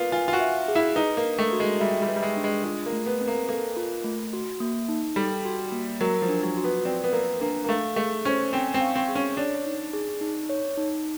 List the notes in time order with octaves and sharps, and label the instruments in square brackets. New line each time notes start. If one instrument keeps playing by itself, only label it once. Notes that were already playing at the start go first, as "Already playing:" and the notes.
Already playing: [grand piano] A#3 B3 F4
[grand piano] F4 [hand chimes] G#5
[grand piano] F4
F#4
[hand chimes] E5
G#4
[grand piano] E4
[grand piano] D#4 [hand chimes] B4
[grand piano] A#3
[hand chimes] D4
[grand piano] A3
[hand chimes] F#4
[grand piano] G#3
[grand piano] G3 [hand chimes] E5
[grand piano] G3
[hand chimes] B4
[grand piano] G3
G#3
[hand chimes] D4
[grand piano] G#3
[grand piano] G#3 [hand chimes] F4
[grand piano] A#3
[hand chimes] A3
[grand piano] B3
[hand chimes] C4
[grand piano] A#3
[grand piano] A#3 [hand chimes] A4
[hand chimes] F4
A3
F#4
A#3
D#4
[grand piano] G3 [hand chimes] A4
[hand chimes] F#4
A#3
[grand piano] F#3 [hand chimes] A#4
[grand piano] F3
[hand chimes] D4
[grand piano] F#3
[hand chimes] F#4
[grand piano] B3
[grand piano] C4 [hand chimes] D5
[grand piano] B3
[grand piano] A#3 [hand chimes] A#4
[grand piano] A#3 [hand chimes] D4
[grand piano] A#3
[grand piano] A3 [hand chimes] F5
[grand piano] A3 [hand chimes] G#4
[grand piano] C#4 [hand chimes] C5
[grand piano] C4 [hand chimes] G#5
[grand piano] C4
[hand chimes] F5
[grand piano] C4
[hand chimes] G#4
[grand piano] C#4
[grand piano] D4 [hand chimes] C#5
[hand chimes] D#4
G#4
D#4
C#5
D#4